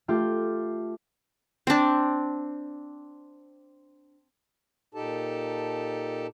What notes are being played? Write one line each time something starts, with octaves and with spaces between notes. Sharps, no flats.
A3 F4 G4
C4 D4
A#2 D#4 G4 A4 A5